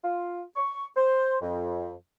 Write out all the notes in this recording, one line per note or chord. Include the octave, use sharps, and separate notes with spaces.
F4
C#6
C5
F2